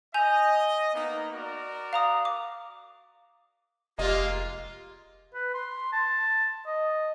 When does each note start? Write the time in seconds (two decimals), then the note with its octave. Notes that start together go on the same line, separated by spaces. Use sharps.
0.14 D#5 G#5 G6 F7
0.94 A#3 B3 D#4
1.33 F#4 A#4 D5
1.93 F5 A#5 D#6
2.25 D6
3.99 F1 G#3 A#3 F4 G4 D#5
5.34 B4
5.54 C6
5.93 A5
6.66 D#5